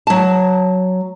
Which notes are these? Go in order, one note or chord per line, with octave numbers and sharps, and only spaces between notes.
F#3 A5